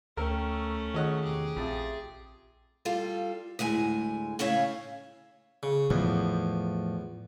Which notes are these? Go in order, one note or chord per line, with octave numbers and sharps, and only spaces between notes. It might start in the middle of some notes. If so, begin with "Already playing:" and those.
D2 A3 C#4 A#4 G5 A#5 E6
D#3 F4 G#4 C#5 D#5 F#5 A#5
E2 C3 G4 G#4
A#1 F2 E5 A6
G3 F4 A4 F5
D2 A2 G#3 G#5
A2 C#3 C#4 E4 C#5 F5
C#3
E2 A2 F3